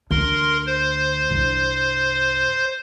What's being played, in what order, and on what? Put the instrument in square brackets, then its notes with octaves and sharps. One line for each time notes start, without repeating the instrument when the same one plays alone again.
[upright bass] D2 [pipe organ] A#4 C6
[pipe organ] C5
[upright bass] C2 G2